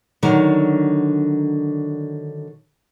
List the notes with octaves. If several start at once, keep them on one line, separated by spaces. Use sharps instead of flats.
D3 D#3 F#3